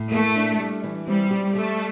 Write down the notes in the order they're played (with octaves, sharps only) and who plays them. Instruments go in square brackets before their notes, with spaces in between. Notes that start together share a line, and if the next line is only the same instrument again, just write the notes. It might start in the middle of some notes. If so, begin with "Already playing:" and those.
Already playing: [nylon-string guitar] A2
[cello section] A3 [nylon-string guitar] A#3
[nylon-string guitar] D4
G3
E3
[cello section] G3 [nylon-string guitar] C4
[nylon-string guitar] G4
[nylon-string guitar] G3 [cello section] A3